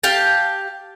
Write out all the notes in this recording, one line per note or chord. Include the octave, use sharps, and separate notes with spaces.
G4 F5 A5